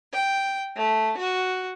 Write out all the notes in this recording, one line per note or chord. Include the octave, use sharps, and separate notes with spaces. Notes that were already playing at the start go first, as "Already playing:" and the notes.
G5
A3
F#4